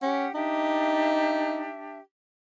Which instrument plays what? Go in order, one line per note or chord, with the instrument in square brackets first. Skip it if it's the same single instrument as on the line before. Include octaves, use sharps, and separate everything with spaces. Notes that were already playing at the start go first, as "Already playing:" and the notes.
[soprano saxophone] C#4 [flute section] G4 F#5
[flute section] D4 G4 E5 [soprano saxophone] D#4